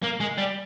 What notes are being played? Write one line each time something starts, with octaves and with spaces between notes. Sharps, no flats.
A#3
G#3
G3